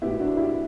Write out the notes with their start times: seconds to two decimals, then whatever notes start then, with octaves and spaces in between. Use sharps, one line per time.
0.02 A2 F#3 B3 E4 G4
0.20 D4 F#4
0.37 E4 G4